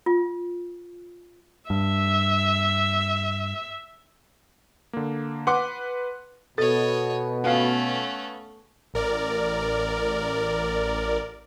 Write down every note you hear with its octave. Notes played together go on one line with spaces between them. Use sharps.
F4
G2 E5
D3 A#3
B4 F#5 C6 D6
B2 A4 C#5 D#5 A6
A3 B3 C#4 F5
A1 A#4 D5